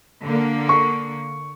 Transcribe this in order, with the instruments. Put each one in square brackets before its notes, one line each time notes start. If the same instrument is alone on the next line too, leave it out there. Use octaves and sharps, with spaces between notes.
[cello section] D3 A#3
[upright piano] C#6